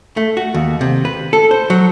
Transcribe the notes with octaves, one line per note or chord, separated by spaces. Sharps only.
A3
F#4
D#2
C3
B4
A4
C5
F#3